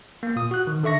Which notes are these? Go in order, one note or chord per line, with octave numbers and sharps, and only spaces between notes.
A#3
A#2 D#6
F#4 F#6
D#3
D3 A4 E5 C#6 A#6